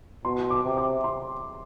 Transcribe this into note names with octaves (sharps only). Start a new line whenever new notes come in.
B2 C6
D6
C3
D6
C6